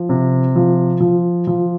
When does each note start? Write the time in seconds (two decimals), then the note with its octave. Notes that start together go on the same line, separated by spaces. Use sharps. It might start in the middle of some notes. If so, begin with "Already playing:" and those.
Already playing: F3
0.09 C3
0.56 F3
1.00 F3
1.47 F3